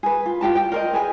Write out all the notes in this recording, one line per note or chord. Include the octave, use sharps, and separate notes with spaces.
G#4 B4
F4
F4 G4 A5
G5
A#4 C5 D#5
G#4 B4 G#5